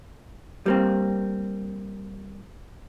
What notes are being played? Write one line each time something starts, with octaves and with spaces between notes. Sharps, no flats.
G3 A#3 C4